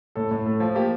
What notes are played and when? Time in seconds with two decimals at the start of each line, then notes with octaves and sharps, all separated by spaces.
0.15 A2 A4
0.31 A2
0.46 A3
0.60 F3
0.75 A#3 G4